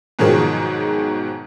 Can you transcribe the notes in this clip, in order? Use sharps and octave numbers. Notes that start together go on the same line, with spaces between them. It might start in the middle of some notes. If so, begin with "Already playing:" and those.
G#2 B2 D#3 F3 F#3 G#4